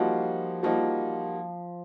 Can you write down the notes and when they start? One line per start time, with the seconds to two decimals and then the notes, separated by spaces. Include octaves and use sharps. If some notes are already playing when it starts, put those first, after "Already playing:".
Already playing: F3 G3 A#3 D#4 F#4
0.63 F3 G3 A#3 D#4 F#4